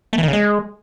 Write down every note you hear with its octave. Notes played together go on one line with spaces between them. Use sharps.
A3
E3
D#3
C#3
G#3